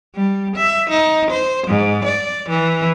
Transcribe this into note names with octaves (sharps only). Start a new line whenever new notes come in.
G3
E5
D#4
C5
G#2
D5
E3